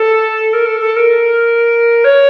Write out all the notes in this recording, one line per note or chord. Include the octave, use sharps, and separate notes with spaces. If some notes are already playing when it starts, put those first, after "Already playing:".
Already playing: A4
A#4
A4
A4
A#4
C#5